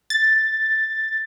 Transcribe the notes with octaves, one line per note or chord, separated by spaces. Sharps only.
A6